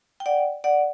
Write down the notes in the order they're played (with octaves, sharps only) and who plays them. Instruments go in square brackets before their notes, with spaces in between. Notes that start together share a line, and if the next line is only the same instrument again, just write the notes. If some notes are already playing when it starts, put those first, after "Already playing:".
[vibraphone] G5
D5 F#5
D5 F#5